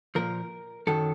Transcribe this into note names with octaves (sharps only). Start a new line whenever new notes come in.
A#2 F3 A#4
F#2 D#3 F#3 A4